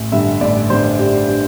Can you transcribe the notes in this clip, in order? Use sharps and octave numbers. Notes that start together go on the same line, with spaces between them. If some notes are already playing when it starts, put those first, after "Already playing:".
Already playing: A1
G2 D3 G3 E5
A1 D5
G2 D3 G3 C5
A1 G4
D3 G3